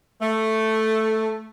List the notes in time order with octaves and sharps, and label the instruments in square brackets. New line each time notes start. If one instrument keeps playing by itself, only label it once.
[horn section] A3